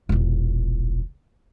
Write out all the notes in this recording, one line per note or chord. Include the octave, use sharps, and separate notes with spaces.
E1 A#1